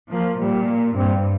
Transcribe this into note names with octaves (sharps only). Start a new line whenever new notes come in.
F3 A#3
A#2 G3
A#3
G2 C4